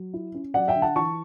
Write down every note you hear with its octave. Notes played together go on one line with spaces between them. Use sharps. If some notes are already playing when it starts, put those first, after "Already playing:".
Already playing: F#3
E4
C#4
F#3 D5 F#5
E5 G5
D3
F#5 A5
E3 A5 C#6